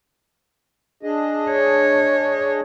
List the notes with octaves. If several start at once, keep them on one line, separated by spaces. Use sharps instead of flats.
D4 G#4 D#5
C#5